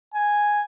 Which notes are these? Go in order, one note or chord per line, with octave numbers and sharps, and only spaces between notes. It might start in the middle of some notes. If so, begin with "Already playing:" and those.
G#5